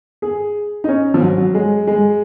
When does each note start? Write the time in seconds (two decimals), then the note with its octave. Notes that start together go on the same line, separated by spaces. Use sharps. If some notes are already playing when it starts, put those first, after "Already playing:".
0.22 G#4
0.84 D#4
0.88 C#4
1.14 F3
1.22 F#3
1.38 F#3
1.54 G#3
1.87 G#3